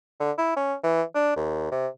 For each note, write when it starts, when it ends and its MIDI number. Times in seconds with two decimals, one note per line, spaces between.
0.20 0.32 50
0.38 0.53 64
0.56 0.74 61
0.83 1.02 52
1.15 1.34 62
1.36 1.69 39
1.71 1.88 48